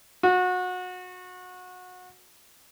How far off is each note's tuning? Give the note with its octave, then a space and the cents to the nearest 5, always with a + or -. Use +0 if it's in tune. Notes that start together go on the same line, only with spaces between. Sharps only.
F#4 -25